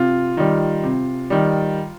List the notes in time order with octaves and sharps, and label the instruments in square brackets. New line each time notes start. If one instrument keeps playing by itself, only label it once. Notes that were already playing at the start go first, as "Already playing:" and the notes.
Already playing: [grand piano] C3 [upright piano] F4
[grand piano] D#3 G3
C3
D#3 G3